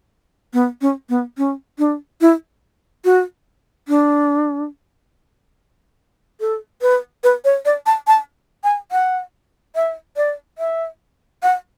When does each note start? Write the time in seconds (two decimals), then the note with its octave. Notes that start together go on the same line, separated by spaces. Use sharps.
0.53 B3
0.82 C#4
1.09 B3
1.38 C#4
1.79 D4
2.21 E4
3.05 F#4
3.88 D4
6.40 A4
6.82 B4
7.24 B4
7.45 C#5
7.65 D5
7.86 A5
8.07 A5
8.64 G#5
8.92 F#5
9.75 E5
10.17 D5
10.58 E5
11.43 F#5